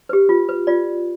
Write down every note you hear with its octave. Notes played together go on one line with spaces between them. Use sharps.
G4 B4
F4
B4
F4 D5